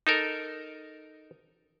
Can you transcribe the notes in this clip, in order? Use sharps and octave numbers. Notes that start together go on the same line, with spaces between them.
D#4 A4 A#4